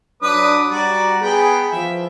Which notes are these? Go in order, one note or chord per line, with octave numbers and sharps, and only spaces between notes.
F#3 D4 B4 D6 D#6
G3 F#4 D5 A#5
B3 G#4 G5 B5
E3 F3 E5